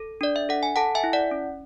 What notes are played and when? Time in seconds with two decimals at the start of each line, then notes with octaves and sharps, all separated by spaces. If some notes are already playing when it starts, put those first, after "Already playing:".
Already playing: A4
0.21 D4 D5
0.36 E5
0.49 A4 F#5
0.63 G#5
0.76 A4 F#5 A5
0.95 E5 G#5
1.04 E4
1.13 D5 F#5
1.31 C#4